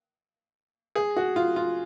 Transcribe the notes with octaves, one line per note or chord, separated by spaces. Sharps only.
G#4
F#4
F4
F4